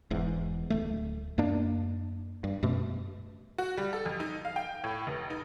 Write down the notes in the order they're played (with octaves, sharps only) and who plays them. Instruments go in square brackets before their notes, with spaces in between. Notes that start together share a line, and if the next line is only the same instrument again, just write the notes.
[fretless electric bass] E1 E2 G#2
D1 A3
F#2 A#3 D4
G2
F#2 B2 A3
[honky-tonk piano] F#4
G3
A4
F2
D#4
F5
G5
A2
F1
D#4